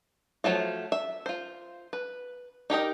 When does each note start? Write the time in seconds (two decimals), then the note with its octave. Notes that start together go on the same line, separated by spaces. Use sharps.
0.44 F3 F#3 A3 F4
0.92 E5
1.26 F4 C5
1.93 B4
2.70 D#4 G4 A#4 D#5